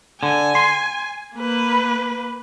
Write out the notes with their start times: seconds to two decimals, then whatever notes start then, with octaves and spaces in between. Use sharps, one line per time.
0.23 D3 G#5
0.55 C6
1.35 A#3 B4